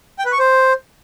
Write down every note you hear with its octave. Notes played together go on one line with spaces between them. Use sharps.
G5
B4
C#6
C5